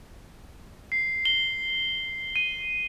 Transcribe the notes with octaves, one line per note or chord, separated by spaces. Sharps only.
C7
G7
D#7